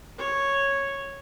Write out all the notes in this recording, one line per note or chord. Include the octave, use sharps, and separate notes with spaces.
C#5